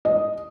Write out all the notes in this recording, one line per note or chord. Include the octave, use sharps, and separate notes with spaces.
D#5